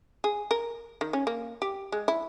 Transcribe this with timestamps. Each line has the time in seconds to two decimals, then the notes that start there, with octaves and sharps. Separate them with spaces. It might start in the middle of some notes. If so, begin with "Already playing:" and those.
0.24 G#4
0.51 A#4
1.01 D#3
1.13 C#4
1.27 A#3
1.62 G4
1.92 G#3
2.08 E4